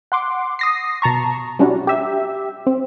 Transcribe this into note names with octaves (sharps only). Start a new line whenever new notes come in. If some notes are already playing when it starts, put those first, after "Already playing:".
F#5 C6 D6
D#6 A#6 C7
B2 A5 A#5 C#6
G3 C#4 D4 E4 F#4
G4 E5
C4